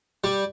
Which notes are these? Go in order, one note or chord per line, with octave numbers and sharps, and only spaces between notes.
G3